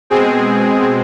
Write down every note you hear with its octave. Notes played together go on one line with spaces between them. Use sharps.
B2 G#3 C4 G#4